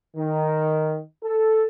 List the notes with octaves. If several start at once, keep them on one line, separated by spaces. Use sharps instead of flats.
D#3
A4